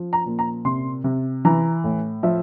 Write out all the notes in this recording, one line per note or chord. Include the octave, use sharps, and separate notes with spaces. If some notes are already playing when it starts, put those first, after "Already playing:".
Already playing: F3
A#5
A#2
A#5
C3 C6
C3
E3 A#5
A2
F3 E5